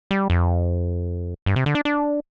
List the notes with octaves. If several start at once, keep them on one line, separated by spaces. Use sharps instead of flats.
G3
F2
G2
C3
D3
D4
D4